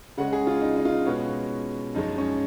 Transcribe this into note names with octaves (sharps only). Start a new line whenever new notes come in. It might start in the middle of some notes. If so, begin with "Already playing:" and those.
C#3 G#3 C#4 F#5
G#4
F4
D#4
D#4
F4
D#4
B2 G#3 B3 C#4
F#2 F3 G#3 C#4 D#4
C#4